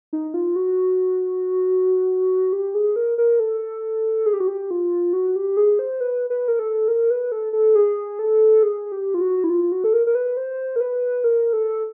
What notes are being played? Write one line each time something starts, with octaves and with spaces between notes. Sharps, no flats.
D#4
F4
F#4
G4
G#4
A#4
A#4
A4
G#4
G4
F#4
G4
F4
F#4
G4
G#4
C5
B4
B4
A#4
A4
A#4
B4
A4
A4
G#4
A4
G#4
G4
F4
F#4
E4
F4
F#4
A4
A#4
A#4
B4
C5
A#4
B4
A#4
A4